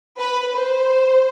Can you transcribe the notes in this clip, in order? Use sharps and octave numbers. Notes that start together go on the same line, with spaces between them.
B4
C5